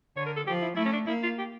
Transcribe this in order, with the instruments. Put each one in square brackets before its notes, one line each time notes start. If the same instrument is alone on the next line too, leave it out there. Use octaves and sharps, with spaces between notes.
[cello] D3 [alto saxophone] C#5
[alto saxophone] A#4
A4
[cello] F3 [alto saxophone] G4
[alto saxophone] E4
[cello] A3 [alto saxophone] E4
[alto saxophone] C#4
D4
[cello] A#3 [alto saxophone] E4
[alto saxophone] F4
G4